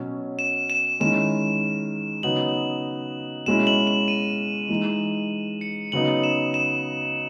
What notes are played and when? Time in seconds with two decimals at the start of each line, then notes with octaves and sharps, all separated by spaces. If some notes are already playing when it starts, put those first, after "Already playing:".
Already playing: B2 F#3 C#4
0.39 E7
0.70 E7
1.00 D#3 G#3 C#4 E4 E7
2.23 C#3 F#3 B3 D#4 F#7
3.46 B2 G#3 C#4 E4 E7
3.67 F#7
3.87 E7
4.08 D#7
4.69 E3 G#3 D#4
5.61 C#7
5.92 C#3 F#3 B3 D#4 F#7
6.23 E7
6.54 E7